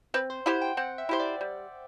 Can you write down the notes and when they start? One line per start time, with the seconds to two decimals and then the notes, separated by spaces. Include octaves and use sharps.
0.14 C4 B4
0.30 C5
0.46 E4 G4 C5 F#5
0.61 G5
0.77 C4 F#5
0.98 E5
1.09 E4 G4 C5
1.20 D5
1.41 G3